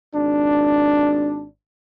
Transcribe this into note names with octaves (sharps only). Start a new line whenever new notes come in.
G#1 D4